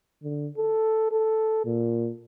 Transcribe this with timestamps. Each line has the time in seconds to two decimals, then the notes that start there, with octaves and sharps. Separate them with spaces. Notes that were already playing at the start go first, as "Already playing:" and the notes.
0.24 D3
0.57 A4
1.12 A4
1.65 A#2